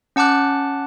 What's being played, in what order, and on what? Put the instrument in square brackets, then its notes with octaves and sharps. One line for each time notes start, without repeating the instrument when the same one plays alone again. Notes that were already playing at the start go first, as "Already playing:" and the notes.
[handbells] C#4 F#5 A5 D6 F#6